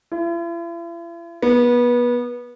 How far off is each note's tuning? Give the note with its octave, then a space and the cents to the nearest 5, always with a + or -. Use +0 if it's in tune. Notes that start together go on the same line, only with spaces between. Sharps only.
E4 +45
B3 -25